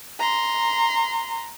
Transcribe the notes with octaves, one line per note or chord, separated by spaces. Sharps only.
A#5 C6